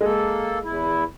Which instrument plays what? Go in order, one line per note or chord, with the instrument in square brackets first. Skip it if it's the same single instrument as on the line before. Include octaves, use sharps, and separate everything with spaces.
[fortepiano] G#3 [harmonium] A#3 A4
[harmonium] E2 E4